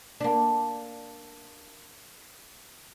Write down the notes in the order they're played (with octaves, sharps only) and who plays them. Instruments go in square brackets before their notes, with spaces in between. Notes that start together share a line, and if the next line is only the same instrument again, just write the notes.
[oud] A#3 D4